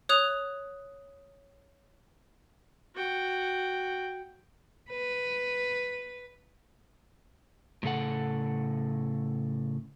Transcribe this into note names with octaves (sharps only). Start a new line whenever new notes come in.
C#5 D#6 F#6 F7
F#4 G5
B4
A2 C#3 A4 F#5